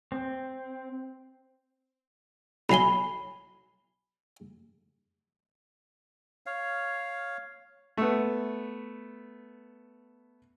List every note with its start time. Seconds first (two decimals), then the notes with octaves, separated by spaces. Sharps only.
0.12 C4
2.69 B1 F#3 G#5 B5 C7 G7
6.46 C#5 F5
7.97 A3 B3